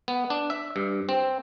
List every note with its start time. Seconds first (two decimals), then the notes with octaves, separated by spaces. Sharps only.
0.08 B3
0.30 D4
0.50 E5
0.76 G2
1.09 C4